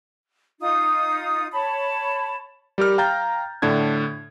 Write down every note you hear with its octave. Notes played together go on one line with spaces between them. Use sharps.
D#4 F4 D#6
C#5 A5 B5
G3 G4 A#4 F6
F5 G5 A#5 G6 A6
A2 D3 D4 G#6